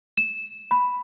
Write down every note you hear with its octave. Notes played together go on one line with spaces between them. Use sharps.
E7
B5